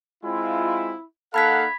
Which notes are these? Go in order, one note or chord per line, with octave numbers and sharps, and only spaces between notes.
G#3 C4 E4 F4
A#3 D#4 A4 F5 F#5 B5 G#6 B6